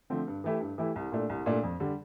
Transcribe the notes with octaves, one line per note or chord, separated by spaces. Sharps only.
D3 F3 A3 C4
G2
E3 A3 E4 G4
G2
E3 A3 E4 G4
C2
A#2 A3 D4
C2
A#2 A3 D4
F2
D3 G3